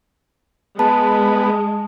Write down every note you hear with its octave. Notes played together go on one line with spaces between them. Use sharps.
G#3 B3 A5